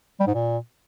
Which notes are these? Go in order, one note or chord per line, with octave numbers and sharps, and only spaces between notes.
G3
G#2
A#2